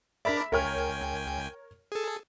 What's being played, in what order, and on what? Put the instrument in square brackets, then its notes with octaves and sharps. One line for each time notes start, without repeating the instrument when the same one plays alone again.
[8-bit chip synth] D4 A#4 D5 [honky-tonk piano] E5 B5 B6
[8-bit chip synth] C#2 G5 G#5 [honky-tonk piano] A#4 C#5 F6
[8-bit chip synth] G#4 A4